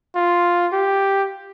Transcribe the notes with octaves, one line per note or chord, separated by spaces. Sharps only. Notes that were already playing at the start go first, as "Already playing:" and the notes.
F4
G4